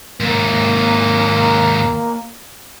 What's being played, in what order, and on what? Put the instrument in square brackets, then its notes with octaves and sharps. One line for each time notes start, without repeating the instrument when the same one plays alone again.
[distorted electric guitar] D#2 G#2 [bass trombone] A#3